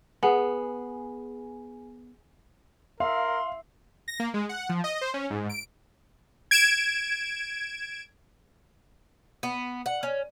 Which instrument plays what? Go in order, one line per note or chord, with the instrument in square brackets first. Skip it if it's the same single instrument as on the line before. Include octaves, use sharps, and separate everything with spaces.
[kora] B3 [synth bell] G#4 G#5
[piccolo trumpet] A#4 [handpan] E5 [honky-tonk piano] F5 [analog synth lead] C6
[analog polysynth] A#6
A#3
G#3
F#5
F3
D#5
C5
C#4
G#2
D7
[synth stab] G#6 D7 E7
[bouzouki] B3
F#5
C#4